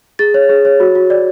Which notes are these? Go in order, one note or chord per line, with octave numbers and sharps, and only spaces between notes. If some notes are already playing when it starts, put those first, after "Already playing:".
G#4 A6
C#5
G#4
C#5
F#4
F#4
D5